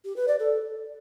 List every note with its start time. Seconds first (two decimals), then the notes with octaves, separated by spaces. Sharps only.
0.05 G4
0.16 B4
0.28 D5
0.39 A4